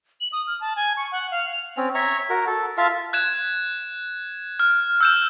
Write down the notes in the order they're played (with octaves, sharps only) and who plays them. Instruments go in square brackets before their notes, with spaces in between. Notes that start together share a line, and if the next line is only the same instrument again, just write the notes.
[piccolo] F#7
D#6
F6
A5
G#5
C#6
F#5
F5
F7
[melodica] C4 C#4
C#5 E5 A#5 C#6
F#4 A#4
A4
F4 E5 F5 A5
[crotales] F#6 G#6 E7
F6
E6 G6 E7